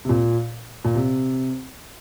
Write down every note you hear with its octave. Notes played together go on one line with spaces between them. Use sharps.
C3
A#2
A#2
C3